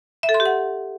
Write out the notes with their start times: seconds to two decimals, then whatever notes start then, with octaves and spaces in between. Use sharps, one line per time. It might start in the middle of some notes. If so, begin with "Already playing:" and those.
0.23 E5
0.29 A4
0.34 C6
0.40 G4
0.46 F#5